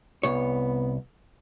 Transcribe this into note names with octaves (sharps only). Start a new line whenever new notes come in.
C2 B3 C#5